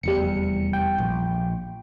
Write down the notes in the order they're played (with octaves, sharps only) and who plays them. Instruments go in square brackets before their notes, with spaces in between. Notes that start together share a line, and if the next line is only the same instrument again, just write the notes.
[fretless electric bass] F1 E2 [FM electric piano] G3 C#7
[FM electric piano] G5
[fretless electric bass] A#1